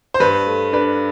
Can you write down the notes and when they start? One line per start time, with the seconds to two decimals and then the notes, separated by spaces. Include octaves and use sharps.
0.14 C5
0.20 G2 B4
0.46 A3
0.73 D4 B4